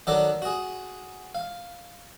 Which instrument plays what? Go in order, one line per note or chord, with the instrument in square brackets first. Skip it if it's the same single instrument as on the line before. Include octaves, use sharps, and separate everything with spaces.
[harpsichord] D#3 F#3 A4 D5 F#5
F#4 G#4
F5